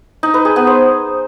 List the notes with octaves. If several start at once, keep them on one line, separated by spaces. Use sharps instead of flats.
D#4
B4
G#4
B3
C5